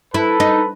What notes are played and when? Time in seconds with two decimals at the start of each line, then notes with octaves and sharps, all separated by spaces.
0.14 E4 A4 B4
0.40 D#4